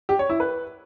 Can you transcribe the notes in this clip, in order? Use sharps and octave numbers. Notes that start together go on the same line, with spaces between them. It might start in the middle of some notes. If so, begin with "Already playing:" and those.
G4
C#5
E4
B4